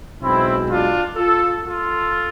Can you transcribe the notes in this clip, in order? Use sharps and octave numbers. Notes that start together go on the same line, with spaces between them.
B1 B2 G#3 C4 E4
D4 F4
F4 A4
F4 A4